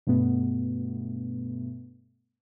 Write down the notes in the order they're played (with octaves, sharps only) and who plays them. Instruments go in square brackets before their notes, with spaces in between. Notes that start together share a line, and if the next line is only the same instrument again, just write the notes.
[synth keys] G2 B2 A3 B3